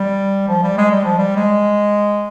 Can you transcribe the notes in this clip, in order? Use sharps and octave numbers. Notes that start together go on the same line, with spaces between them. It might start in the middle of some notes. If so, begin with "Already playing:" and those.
Already playing: G3
F3
G3
G#3
G3
F3
G3
G#3